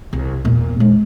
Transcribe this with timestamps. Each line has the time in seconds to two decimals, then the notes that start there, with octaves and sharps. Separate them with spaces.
0.13 C2
0.45 E2 A#2
0.80 G#3